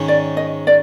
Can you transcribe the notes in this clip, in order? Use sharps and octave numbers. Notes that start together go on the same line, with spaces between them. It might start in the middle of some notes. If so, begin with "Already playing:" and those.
Already playing: G#2 D#3 C#4
D5
D#5
D5